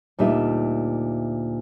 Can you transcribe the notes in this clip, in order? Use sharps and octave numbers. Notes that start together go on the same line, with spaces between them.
D2 A#2 G3 D#4 E5